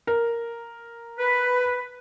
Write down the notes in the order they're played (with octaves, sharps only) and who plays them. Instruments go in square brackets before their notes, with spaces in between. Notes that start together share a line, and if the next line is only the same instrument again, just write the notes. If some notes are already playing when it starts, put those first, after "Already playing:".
[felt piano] A#4
[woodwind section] B4